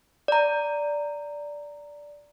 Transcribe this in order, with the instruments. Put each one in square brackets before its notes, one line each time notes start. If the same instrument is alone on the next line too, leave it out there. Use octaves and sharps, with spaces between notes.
[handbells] D5 A#5